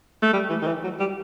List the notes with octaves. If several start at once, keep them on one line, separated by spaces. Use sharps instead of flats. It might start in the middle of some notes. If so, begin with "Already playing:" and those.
A3
G3
E3
D#3
E3
F#3
G3